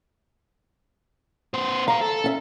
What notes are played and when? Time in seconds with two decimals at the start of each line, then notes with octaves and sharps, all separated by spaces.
1.54 B3 C5
1.88 B4 F5 A#5
2.01 A4
2.24 C#4 E5